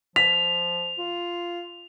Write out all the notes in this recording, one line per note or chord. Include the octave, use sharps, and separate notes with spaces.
F3 B6 F7
F4